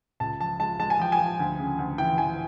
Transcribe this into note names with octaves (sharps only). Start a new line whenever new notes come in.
C#2 A5
F3 A5
G#3 A5
G#3 A5
G#5
F3 G5
G#5
F3
D2
C#3
D2
E3 G5
E3 G#5